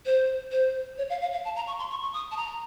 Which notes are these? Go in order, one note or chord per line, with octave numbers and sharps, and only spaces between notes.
C5
C5
C#5
F5
F5
F5
A5
A#5
C#6
C6
C#6
C#6
D#6
A5
A#5